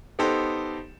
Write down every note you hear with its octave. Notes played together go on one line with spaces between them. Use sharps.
B3 D#4 G4 A4 C5